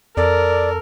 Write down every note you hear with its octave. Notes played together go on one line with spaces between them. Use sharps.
F2 A4 A#4 D5